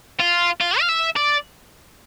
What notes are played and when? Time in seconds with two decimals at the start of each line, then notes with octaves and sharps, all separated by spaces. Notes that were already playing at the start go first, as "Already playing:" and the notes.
0.20 F4
0.61 F4
0.80 F5
0.89 E5
1.16 D5